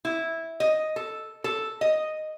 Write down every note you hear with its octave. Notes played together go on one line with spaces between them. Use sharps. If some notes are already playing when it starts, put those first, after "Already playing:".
E4
D#5
A4
A4
D#5